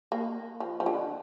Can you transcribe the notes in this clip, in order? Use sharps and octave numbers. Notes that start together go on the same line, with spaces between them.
A#3
F3
F3
D3